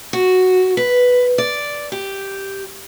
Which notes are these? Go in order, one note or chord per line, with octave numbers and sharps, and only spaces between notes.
F#4
B4
D5
G4